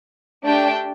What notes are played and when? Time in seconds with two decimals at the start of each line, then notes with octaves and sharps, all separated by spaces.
0.45 A3 D4 G4 G5 A5